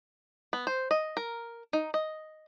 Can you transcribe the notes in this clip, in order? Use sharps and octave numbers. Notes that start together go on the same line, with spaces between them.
B3
C5
D#5
A#4
D#4
D#5